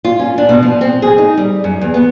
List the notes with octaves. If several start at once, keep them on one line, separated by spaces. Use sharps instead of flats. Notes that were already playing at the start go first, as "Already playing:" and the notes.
F4
C#4
D4
B2
F3
C4
G#4
D#4
G3
F#2
E2
B3